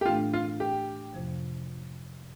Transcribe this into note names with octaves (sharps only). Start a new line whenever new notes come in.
G4
A2 E3 A3 D4 F4
F4
G4
F2 C3 F3